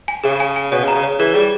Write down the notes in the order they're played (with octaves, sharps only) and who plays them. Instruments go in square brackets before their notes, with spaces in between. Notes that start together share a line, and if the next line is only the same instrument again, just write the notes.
[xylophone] G#5
[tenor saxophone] C#3 [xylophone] G#4
[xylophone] G#5
G#5
[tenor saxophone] B2 [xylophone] C#5
[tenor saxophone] C#3
[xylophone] A#5
[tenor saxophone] C#3
[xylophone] C#5
[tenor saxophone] E3 [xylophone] G#4
[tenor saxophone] G3 [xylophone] G#4